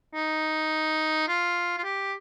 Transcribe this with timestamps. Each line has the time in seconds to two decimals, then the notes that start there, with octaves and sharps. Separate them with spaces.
0.14 D#4
1.28 F4
1.78 F4
1.83 G4